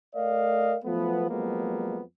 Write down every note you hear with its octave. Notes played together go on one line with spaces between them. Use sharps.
A3 A#4 D5 D#5 F5
F3 F#3 A3 B3
F2 F#3 G#3 A#3 B3